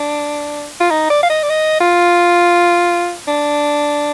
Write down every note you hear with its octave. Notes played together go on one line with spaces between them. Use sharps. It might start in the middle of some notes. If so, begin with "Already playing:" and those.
Already playing: D4
F4
D#4
D5
F5
D#5
D5
D#5
F4
D4